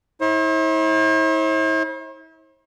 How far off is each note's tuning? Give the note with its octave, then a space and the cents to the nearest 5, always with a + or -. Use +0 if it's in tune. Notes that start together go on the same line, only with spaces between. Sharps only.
E4 -40 C5 +45